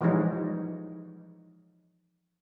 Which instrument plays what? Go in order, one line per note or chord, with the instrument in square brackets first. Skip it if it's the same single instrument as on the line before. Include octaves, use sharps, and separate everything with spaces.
[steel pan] E3 F3 G3 G#3 D#4 C#5